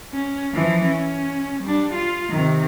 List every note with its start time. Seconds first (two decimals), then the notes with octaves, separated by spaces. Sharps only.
0.13 C#4
0.54 E3 F3
0.85 C#4
1.63 G3 D4
1.94 F4
2.30 C3 D#3